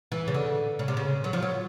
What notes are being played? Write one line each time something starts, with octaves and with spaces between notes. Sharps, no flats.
E3
C#3
D3
C#3
C3
C#3
F#3
F3
F#3